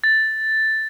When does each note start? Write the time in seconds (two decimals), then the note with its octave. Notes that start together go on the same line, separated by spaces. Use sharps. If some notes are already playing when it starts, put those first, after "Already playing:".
0.04 A6